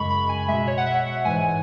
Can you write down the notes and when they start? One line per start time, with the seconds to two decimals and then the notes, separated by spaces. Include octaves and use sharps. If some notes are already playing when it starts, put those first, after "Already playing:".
Already playing: F#2 C#3 G#3 B5 C#6
0.10 B5
0.29 G#5
0.48 B2 G#3 E5
0.67 C#5
0.77 F#5
0.87 E5
1.06 F#5
1.25 G#2 E3 G#3 G#5
1.40 G#5